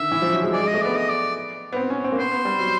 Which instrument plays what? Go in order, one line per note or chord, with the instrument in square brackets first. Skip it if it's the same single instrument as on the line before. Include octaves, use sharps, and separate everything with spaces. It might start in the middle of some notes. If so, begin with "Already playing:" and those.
Already playing: [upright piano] D3 D#3 [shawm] E5
[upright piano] E3
F3
F#3
G#3
[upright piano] G#3 [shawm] D5
[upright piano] G#3
[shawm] D#5
[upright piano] A3
[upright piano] B3 [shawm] D5
[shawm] D#5
D5
[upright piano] B3
C4
C#4
C4
A#3
[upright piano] B3 [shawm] C5
[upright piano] B3
G3
F#3